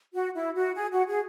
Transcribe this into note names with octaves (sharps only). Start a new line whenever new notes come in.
F#4
E4
F#4
G#4
F#4
G#4